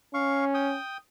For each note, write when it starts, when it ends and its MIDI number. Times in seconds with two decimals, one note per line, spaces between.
0.14 0.76 61
0.14 0.45 77
0.14 0.45 85
0.54 0.97 79
0.54 0.97 87